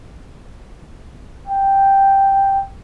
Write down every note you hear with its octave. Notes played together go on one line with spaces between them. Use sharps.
G5